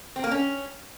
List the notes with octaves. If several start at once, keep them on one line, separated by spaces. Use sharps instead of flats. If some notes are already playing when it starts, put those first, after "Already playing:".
C4
A#3
C#4